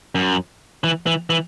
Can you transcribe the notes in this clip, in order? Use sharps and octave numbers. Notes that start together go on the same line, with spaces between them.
F#2
E3
E3
E3